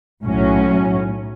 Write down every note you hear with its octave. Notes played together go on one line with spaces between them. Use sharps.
B1 A2 F#3 C#4